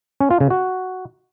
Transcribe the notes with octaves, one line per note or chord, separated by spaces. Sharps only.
C#4
F4
C#3
F#4